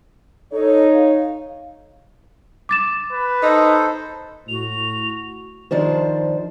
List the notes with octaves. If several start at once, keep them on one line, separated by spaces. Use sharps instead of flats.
D#4 A4 C#5
F5
D6 A6 E7
B4
D#4 A4 C5
A2 F#4 F7
D#3 F3 D4 C5